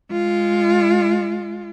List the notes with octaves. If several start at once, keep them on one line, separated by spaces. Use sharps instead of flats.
G#3 F4